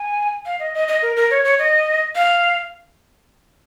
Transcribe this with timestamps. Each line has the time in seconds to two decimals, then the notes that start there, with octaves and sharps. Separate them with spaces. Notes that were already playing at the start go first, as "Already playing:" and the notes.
Already playing: G#5
0.46 F5
0.60 D#5
0.74 D#5
0.88 D#5
1.02 A#4
1.16 A#4
1.30 C#5
1.44 C#5
1.59 D#5
2.15 F5